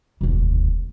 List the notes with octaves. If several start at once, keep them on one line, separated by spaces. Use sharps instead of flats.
E1 D2